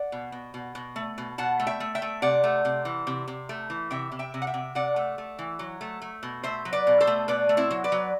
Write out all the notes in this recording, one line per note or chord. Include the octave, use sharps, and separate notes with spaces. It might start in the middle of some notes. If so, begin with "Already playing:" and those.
Already playing: D5 F#5
B2
B2
B2
B2
A3
B2
B2 F#5 A5
A3
E5 G5
A3
E5 G5
A3
C3 D5 F#5
A3
C3
E3
C3
C3
A3
E3
C3 E5 G5
C3
E5 G5
C3
F#5
E5 G5
C3
C3 D5 F#5
A3
A3
E3
F#3
A3
A3
B2
A3 C5 E5
F#3
B4 D5
B2
A4 C5
A3
B2 B4 D5
A3
C4 E4
F#3
B4 D5
F#3